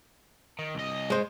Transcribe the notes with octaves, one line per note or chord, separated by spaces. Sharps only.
D#3
C2 D#5
G#3 C5